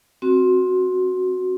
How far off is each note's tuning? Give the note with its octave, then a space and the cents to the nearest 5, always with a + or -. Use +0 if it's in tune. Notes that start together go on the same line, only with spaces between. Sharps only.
C4 +10 F#4 +0